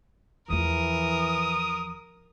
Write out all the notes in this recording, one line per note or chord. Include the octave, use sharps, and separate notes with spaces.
E2 E3 F3 A#4 D#6